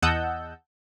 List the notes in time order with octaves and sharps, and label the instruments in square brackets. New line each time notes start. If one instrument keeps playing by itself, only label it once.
[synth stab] E2 D#5 F#5 A5 E6 G6